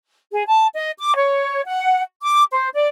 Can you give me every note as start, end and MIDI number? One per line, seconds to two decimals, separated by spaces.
0.33 0.43 68
0.48 0.66 81
0.75 0.91 75
0.99 1.13 86
1.16 1.62 73
1.66 2.01 78
2.23 2.44 86
2.52 2.68 72
2.74 2.87 74